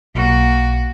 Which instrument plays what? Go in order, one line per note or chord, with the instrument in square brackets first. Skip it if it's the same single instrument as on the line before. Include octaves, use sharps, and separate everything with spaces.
[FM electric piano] B1 [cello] A#3 F#4